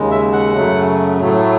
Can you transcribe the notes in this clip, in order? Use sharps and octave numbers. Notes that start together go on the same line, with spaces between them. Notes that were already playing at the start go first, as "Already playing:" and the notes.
Already playing: D#2 C#3 G#3
E5
F#5
F#2 C#3 F#3 A3
A2 F#3 A3